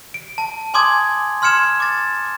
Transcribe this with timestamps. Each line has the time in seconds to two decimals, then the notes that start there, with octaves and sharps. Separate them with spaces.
0.14 D7
0.38 A5
0.74 G#5 C6 D6 D#6 G#6
1.42 C6 F6 G#6 C#7 E7
1.80 D6 A6